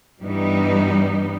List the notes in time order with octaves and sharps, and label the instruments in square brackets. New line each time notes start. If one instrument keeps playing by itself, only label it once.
[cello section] G2 E3 G3 B3 D#4